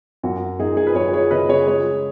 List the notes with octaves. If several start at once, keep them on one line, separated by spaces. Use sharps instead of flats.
F#2 F#4
F#2 D#4 G#4
G#4
B4
F#2 G#4 C#5
G#4 C#5
C#3 B4 D#5
G#4 C#5
G#3 G#4 C#5